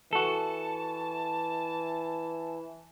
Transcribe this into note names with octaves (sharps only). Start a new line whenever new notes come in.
E3 F#4 A4 A5